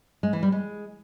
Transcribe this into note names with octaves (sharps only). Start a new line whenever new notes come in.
G#3
E3
G3
G#3